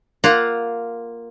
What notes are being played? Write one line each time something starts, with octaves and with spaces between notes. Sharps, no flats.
A#3 F4 F#5 A#5